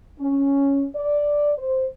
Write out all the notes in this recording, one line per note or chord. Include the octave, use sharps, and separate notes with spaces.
C#4
D5
C5